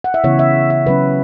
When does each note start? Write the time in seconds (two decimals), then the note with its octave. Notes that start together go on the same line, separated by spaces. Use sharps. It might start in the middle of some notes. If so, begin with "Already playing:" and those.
0.04 F#5
0.14 E5
0.24 C#3 E3 B3 E4 C#5
0.39 E5
0.70 E5
0.86 C#3 F#3 C#4 B4